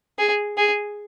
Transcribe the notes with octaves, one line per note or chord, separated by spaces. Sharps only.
G#4
G#4